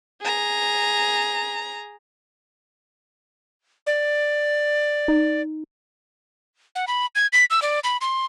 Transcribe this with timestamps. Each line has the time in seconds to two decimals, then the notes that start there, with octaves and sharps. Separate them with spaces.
0.22 G#4 A#5
3.87 D5
5.08 D#4
6.75 F#5
6.87 B5
7.15 G#6
7.33 B6
7.50 E6
7.62 D5
7.84 B5
8.01 C6